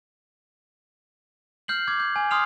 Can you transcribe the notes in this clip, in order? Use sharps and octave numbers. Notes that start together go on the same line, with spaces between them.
F6 G6 C7 F#7
D6 G#6
G6
G#5
C6 D#6 F6 C7 F7